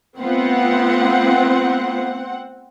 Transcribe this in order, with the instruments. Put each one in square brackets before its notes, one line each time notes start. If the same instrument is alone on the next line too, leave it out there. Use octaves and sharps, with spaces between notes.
[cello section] A3 B3 F4 [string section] C4 F#5